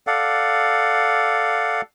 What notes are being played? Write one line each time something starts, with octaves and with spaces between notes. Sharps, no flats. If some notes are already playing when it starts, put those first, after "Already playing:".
A4 D5 F5 F#5